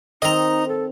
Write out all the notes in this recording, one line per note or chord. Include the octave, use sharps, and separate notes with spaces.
D#3 C4 D#4 D#5 A#5
A4